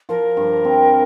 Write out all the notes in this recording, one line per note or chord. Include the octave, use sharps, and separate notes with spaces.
F3 A#4
G2
C4